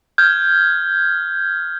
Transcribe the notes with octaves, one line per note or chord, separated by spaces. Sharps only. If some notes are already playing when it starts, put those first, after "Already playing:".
F6 G6 G#6